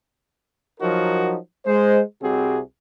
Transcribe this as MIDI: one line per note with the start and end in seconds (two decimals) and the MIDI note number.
0.80 1.36 53
0.80 1.36 54
0.80 1.36 63
0.80 1.36 66
0.80 1.36 70
1.65 2.00 56
1.65 2.00 72
2.22 2.60 36
2.22 2.60 48
2.22 2.60 55
2.22 2.60 60
2.22 2.60 66
2.22 2.60 68